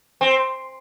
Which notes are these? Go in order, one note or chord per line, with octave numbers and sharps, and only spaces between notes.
C4